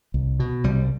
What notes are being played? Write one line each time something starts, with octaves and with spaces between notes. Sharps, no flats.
C2
B2
C2 G3